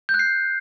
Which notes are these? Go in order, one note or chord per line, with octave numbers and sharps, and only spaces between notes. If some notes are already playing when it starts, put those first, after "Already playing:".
G6
F#6
C7